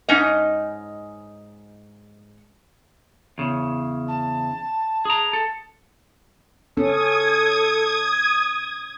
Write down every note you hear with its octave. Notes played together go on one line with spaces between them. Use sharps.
G#2 C#4 D#4 D#5
E2 C#3
A5
G#4 A#5
A4
C#4 A4 D#6 G#6